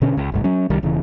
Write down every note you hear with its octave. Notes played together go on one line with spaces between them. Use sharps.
B2 D3 C#4
C#2
F#1 B1 G#2
F#3 C#4
C2 D#3 G3
E1 C#3 E3